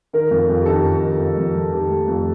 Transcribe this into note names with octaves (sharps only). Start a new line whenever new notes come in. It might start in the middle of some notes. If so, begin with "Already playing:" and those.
D#3 A#4
F2
F2
G4
D#3 A4
F2
D#3
F2
F2
F2
D#3 G4
A3
F2